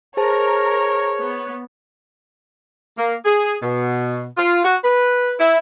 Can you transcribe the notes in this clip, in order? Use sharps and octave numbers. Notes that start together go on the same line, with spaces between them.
G#4 A#4 C5 C#5 A5 A#5
B3
A#3
G#4
B2
F4
F#4
B4
E4